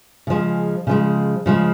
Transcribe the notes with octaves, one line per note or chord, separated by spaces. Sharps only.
C#3 F3 G#3
C#3 F3 G#3
C#3 F3 G#3